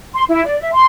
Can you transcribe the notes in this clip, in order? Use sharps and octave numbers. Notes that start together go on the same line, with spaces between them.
C6
E4
D5
E5
C6